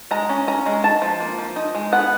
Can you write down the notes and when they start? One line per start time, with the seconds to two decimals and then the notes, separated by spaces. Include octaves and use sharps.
0.11 G#3 A#5
0.29 C#4
0.47 C#4 A#5
0.66 G#3
0.84 D#4 A5
1.02 F3
1.20 A#3
1.39 F3
1.56 D#4
1.75 G#3
1.92 B3 F#5